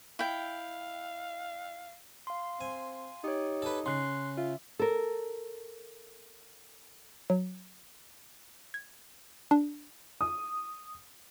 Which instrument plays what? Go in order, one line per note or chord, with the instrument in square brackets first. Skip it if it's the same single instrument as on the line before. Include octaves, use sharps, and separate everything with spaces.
[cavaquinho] E4 G5 [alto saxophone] F5
[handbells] F5 C6
[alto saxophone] C4 [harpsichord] G#5
[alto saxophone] D#4 [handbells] G4 C#5
[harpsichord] A4 B4
[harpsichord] C#3 [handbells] C6 F#6 C7
[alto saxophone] F4 [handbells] E5
[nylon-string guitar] A4 A#4
[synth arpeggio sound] F#3
G#6
D4
[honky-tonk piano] D#6